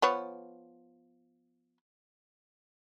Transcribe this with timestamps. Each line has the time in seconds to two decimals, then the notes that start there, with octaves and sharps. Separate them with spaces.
0.02 F3 B3 C#5